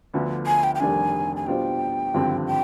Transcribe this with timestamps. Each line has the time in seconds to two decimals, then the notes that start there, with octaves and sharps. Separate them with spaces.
0.14 D2 D3 F3 B3 D4
0.47 G#5
0.64 G5
0.75 G5
0.80 F1 F2 D#3 G3 D4 G#5
1.36 G#5
1.47 B2 G3 D4 F4 C5 G5
2.14 G#1 G2 D3 F3 C4
2.47 G5